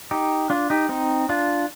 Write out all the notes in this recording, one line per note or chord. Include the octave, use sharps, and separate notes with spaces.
D#4 G4
D4 F4
D#4 G4
C4 D#4
D4 F4